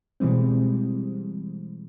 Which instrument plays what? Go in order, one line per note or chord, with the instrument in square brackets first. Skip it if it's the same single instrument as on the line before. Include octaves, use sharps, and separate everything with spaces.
[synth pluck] B2 E3 G3 G#3 C4